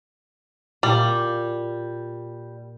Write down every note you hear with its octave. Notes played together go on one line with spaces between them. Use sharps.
A#2 G3